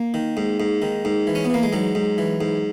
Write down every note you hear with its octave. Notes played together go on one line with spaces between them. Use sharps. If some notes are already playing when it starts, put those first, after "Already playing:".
Already playing: A#3
D#3
G#2
G#2
D#3
G#2
E3
C#4
B3
E3 A#3
G#3
G#2 F#3
G#2
E3
G#2